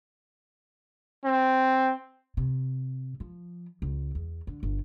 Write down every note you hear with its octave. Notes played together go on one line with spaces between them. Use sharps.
C4
C3
F3
C#2
E2
D3
G1